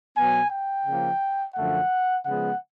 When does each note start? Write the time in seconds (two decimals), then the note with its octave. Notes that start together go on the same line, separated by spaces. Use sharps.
0.16 B2 F#3 B3 G#5
0.50 G5
0.85 C#3 F3 A#3
1.55 F#2 D3 F3 A3 F#5
2.25 C#3 F3 G#3 B3 F#5